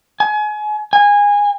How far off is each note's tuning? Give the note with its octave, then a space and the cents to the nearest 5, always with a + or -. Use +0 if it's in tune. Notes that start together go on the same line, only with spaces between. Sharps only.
G#5 +30
G#5 -20